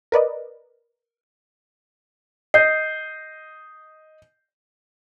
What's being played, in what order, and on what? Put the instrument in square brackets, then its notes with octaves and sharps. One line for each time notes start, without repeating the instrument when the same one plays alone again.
[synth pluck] A#4 B4 D5 D#5
[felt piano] D#5 [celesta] G6 C7